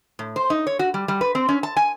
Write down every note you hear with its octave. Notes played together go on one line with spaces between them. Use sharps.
A2
C5
D#4
C#5
F#4
G3
G3
B4
C4
C#4
A5
G#5